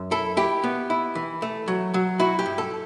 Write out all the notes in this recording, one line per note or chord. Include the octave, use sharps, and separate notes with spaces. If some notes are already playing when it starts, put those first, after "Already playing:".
Already playing: F#2
E4 A4
E4 G4
B3
E4
E3
A3
F#3
F#3
E4 F#4
G4
G2
A4